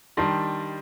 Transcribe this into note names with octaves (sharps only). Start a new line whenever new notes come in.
D#3 G3 D4 A5 C6